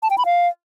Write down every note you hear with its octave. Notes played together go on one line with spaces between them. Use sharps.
A5
G5
B5
F5